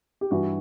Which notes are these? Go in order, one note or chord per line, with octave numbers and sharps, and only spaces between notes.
G4
G2 E3 G3 F#4